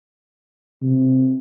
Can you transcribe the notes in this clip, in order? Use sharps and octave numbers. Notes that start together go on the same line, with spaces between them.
C3